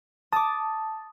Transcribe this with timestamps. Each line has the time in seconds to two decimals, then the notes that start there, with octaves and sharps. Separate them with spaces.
0.32 A5 D6 D#6